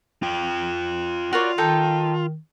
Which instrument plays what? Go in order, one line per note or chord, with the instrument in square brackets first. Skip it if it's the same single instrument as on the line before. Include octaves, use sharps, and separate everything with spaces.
[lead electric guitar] F4 G5
[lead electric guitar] F4 [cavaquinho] F#4 A#4 C#5 [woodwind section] D5
[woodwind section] D#3 [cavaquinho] D#4 A4 G5